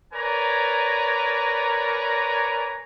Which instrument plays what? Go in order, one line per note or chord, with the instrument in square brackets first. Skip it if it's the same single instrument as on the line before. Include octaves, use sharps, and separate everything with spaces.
[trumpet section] A#4 B4 C#5 D5 G#5 A#5